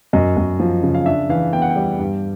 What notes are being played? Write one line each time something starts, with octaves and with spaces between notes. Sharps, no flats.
F#2 D#5
F#2
F3
C#3
F5
D4 E5
E3 F5
B3 G5
F#5
G5
G3
G2